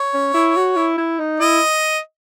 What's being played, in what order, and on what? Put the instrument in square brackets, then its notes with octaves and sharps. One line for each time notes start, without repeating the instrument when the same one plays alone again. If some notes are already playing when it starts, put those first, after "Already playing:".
Already playing: [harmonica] C#5
[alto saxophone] C#4
E4
F#4
E4
E4
D#4
[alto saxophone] E4 [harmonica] D#5